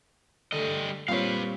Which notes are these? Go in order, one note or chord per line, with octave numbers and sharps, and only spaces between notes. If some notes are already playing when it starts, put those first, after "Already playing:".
D3 G3 A3 D#5
A#2 G3 C4 F4 B4 C#5 F5